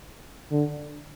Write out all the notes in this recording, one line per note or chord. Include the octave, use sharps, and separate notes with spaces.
D3